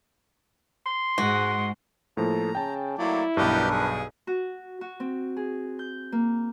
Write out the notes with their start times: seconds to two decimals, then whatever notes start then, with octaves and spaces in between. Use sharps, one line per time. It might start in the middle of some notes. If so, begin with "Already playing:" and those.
0.87 C6
1.18 G#2 G#3 F#4
2.17 A2 F3 A#3 A4 A#5
2.55 C#3 G5 A5
2.98 F#3 A3 A#3 E4 D5
3.37 B1 G2 D4 G4 A#4 B4 D5 D#5
3.71 G#4
4.27 F#4
4.81 F#4
5.00 C4
5.36 G#4
5.79 G6
6.12 A#3